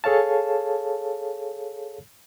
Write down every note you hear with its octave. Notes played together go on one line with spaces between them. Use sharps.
G#4 A4 C#5 F5 A5